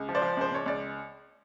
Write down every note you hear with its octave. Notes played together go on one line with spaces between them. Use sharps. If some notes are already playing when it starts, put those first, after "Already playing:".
Already playing: C#2
F3
C5 D5
F3
C#2 C5
C#2 C#5
C#2 D5